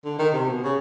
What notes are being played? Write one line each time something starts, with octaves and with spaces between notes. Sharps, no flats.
D3
D#3
C3
B2
C#3